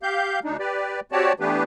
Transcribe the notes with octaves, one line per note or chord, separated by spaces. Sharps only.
G4 F5 G6
D2 D4 D#4
G4 B4 D5
C4 F#4 G4 C#5 D5 A5
E3 A3 B3 D4 G4 B4